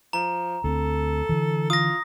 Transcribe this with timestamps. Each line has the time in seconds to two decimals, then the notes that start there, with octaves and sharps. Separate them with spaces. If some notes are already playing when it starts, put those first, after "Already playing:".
0.13 F3 A#5
0.64 D2 C4 A4
1.29 D3 E3
1.70 F4 D#6 A#6